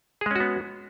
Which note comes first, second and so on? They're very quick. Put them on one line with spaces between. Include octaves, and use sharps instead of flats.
G#4 G#3 C#4 F#4 B3